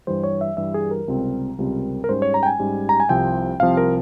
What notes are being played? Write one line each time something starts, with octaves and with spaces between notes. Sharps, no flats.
G2 E3 G3 C5
C#5
E5
G2 E3 G3 E5
G#4
A#4
C#2 C3 G3 C4
C#2 C3 G3 C4
A#4
G#2 G3 C#4 C5
C#5
A#5
G5
G#5
G#2 G3 C#4
A#5
G#5
C2 C3 F3 C4 G5
C2 C3 F3 C4 F5
A#4